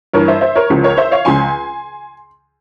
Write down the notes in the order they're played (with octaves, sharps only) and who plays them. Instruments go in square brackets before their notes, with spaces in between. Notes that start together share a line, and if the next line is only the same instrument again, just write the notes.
[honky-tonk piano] G2 E3 A#4 C#5
C5 E5
C5 E5
A#4 C#5
C#2 C#3 F3
A#4 C#5
C5 E5
C#5 F5
C#2 C#3 F3 G#5 C6